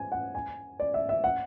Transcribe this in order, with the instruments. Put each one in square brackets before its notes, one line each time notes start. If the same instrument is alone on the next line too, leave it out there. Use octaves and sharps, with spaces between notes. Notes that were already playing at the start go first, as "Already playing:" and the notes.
Already playing: [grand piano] G#5
F#5
G#5
D5
E5
E5
F#5